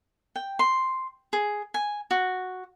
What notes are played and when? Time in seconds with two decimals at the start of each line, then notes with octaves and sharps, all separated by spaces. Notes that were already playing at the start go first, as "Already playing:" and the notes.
0.36 G5
0.59 C6
1.33 G#4
1.74 G#5
2.11 F#4